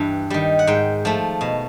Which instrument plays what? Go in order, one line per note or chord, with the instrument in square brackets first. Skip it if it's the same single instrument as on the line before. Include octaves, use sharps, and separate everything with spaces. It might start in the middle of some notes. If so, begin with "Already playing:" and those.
Already playing: [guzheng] G2 E3
D#3 G3
F#5
G#2 G5
F3 A3
B2